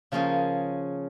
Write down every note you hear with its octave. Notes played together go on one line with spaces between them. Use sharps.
C#3 F3 A#3 C#4 G#4